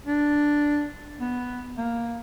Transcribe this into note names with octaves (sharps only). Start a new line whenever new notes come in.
D4
B3
A#3